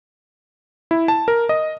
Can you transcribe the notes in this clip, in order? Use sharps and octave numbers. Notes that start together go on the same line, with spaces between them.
E4
A5
A#4
D#5